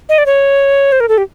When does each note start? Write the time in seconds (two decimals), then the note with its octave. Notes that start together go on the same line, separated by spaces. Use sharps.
0.09 D#5
0.18 D5
0.26 C#5
0.92 C5
1.00 A#4
1.08 A4
1.18 G4